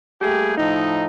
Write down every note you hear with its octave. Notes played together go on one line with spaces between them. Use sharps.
G3 A3 A#3 G4 G#4
A2 F3 D#4